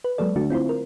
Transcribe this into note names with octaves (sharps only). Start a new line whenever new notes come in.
B4
F#3 G#3 A#3 A4 D5
D3 A3 D4 F#4
C4 E4 F4 C5
A#4